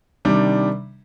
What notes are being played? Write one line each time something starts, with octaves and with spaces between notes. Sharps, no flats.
C3 D#3 G3 D4